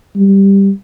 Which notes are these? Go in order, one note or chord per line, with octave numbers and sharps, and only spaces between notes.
G3